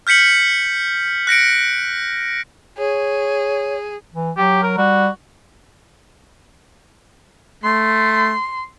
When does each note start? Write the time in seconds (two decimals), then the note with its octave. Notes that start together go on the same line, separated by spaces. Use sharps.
0.07 F6 G6 B6 C#7 F#7
1.27 F#6 A#6 C#7 D7
2.78 G#4 C#5
4.14 E3
4.37 F#3 G4
4.63 A#4
4.78 G3 F#4
7.64 A3 C6